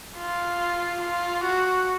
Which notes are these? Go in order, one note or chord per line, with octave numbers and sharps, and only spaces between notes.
F4
F4
F#4